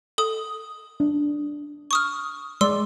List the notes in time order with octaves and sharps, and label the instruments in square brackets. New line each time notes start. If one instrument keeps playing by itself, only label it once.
[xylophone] A4 D#6
[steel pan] D4
[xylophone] C#6 D#6 F6
[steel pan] G#3 D5 [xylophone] C6 E6